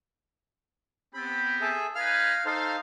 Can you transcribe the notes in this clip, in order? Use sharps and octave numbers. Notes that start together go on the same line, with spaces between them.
B3 C4 G4 B5
G#4 A4 E5
D#4 B4 F5 G#5 F6
D#4 A4 C5 F5